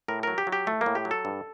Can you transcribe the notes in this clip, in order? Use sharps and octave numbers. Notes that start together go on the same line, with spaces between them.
A2 A#4
F#3 A#4
G4
F#3
G4
A2 A3
A#3
A2
G4
F#3
A4
G2